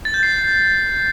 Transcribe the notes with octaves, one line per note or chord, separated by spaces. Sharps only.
A6
G6
C7